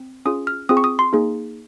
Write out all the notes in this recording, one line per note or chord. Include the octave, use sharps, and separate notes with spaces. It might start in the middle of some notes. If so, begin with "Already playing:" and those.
Already playing: C4
C#4 F4 G#4 D#6
F6
C4 F4 G#4 D#6
C#6
D#6
C6
A#3 D#4 G#4